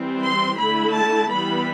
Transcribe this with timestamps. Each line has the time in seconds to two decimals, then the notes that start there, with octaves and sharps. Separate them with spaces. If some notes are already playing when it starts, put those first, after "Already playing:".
Already playing: E3 G3 C4
0.23 C6
0.59 D3 A3 E4 B5
0.95 A5
1.31 E3 G3 B3 B5